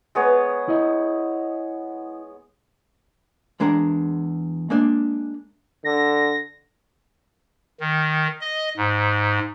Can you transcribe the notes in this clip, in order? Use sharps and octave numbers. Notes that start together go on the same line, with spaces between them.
G#3 B3 C#5
E4 D#5
E2 G#3 D4 A#4 A#5
G#3 A#3 D4
D3 A#6
D#3
D#5
G#2